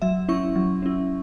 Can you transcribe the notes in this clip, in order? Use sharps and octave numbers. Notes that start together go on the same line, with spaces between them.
F#3 E5
C#4 E4 C#6
F#3
C#4 E4